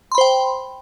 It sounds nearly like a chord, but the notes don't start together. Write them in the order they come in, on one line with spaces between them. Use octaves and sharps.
C6 B5 C5 G5